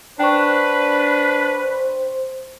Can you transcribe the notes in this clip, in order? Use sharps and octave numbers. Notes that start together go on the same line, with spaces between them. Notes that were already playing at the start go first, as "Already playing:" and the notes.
D4 B4 C5 G5 C#6